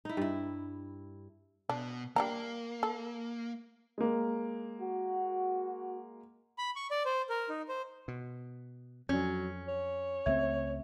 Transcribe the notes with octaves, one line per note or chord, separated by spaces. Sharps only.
D#4 E4
G2 E4
B2 D4
G3 A#3 D4 A#5
A4
G#3 A#3
F#4
B5
C#6
D5
C5
A#4
D#4
C5
B2
F2 F#3 C#4
C#5
C#2 A3 C4 E5 G#6